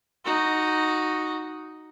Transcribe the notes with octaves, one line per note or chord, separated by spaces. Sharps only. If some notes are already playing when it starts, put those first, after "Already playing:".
D#4 F#4